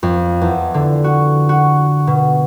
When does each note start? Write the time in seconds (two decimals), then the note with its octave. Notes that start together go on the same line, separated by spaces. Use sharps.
0.03 F2
0.41 E2
0.74 D3
1.04 F#4
1.49 F#4
2.07 B2